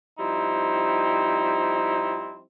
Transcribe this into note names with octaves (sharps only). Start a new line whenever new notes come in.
F3 G3 C4 D#4 E4